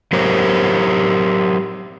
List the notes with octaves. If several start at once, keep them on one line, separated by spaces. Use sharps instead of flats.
F#3 G4 A#4 C5 C#5